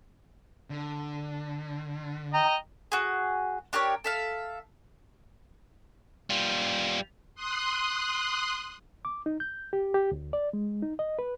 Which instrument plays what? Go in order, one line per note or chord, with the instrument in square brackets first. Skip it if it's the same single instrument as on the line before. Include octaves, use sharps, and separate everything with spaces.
[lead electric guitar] D3
[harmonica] D#5 G5 A#5
[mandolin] F#4 G#4
D4 G4 A#4 C#5
A4 E5 F5
[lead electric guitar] G3 F4
[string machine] C6 D#6 F#6
[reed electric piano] D6
D#4
G6
G4
G4
D2
D5
G#3
D#4
D#5
B4